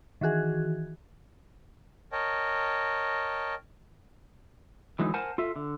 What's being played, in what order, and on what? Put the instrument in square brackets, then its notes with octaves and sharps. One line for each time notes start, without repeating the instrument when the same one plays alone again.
[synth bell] D#3 E3 F#4 G#4
[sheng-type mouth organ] A#4 C#5 D#5 G5 A5
[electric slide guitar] D3 E3 F#3 G#3 D#4
A#4 C5 F#5 G#5 A5
F4 A4 E5
D3